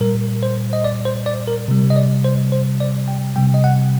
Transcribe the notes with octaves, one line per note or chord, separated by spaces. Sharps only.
A#2 G3 A#4
C5
D#5
D5
C5
D5
A#4
C3 G3
D#5
D5
C5
C5
D5
G5
C3 G3 G5
D#5
F#5